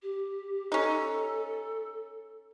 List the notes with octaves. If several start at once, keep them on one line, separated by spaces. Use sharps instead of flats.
G4
C#4 D#4 A4